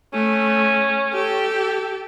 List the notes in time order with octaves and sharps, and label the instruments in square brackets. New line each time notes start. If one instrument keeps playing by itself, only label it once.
[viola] A3 [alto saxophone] C#4
[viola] G4 A4